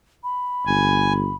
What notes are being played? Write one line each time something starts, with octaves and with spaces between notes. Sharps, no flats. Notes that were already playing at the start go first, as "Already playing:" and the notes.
B5
G1 G#5